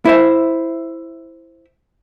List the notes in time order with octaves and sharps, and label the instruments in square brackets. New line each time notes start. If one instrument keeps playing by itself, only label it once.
[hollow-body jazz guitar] E4 C5 E5